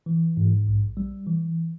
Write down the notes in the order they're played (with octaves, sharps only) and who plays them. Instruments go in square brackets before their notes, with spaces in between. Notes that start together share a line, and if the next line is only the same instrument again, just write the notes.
[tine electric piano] E3
G#2
A#1
G3
E3